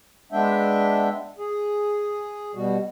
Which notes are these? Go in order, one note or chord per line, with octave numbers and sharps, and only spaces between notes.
G#3 B3 D4 E5 G5
G#4
B2 G3 F#4